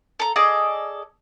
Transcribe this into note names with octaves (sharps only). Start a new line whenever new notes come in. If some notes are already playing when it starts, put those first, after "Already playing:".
A4 A#5
G#4 A4 D5 D#5